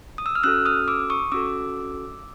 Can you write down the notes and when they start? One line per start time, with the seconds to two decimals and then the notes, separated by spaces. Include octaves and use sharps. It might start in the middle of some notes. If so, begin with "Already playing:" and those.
0.18 D#6
0.26 E6
0.35 F6
0.43 C#4 F#4 A4 E6 F#6
0.65 D#6 F6
0.88 D6 E6
1.10 C#6 D#6
1.32 C#4 F#4 A4 D6 E6